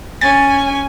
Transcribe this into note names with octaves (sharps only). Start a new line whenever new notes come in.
C#4 G#5 A6